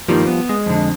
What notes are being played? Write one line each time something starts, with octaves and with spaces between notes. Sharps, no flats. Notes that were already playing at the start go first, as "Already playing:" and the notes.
G2 D#3 F3 G3 A#3
B3
G#3
F2 D3